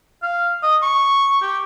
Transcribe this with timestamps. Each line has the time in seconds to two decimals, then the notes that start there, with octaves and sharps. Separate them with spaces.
0.23 F5
0.63 D#5
0.83 C#6
1.42 G4